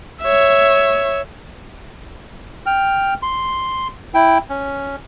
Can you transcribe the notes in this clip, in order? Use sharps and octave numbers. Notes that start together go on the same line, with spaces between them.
C#5 E5
G5 F6
C6
E4 G5
C#4